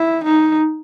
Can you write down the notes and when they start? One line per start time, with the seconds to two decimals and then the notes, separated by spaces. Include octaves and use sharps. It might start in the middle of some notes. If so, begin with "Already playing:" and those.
Already playing: E4
0.24 D#4